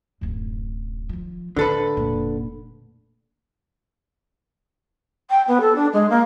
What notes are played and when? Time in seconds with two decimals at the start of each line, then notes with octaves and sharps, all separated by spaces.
0.21 D1 F#2
1.09 D#3 F3
1.56 A2 D3 A4 B4
1.97 F1 A#2
5.30 G5
5.47 B3
5.61 A4
5.75 D4
5.93 G#3
6.10 A#3